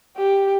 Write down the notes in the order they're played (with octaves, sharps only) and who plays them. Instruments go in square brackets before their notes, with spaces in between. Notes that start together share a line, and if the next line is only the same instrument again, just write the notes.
[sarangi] G4